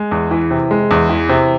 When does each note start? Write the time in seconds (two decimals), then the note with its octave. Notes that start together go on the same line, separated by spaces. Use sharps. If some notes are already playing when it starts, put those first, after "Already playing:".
Already playing: G#3
0.11 E2
0.31 E3
0.51 C3
0.71 G#3
0.91 E2
1.09 E3
1.29 C3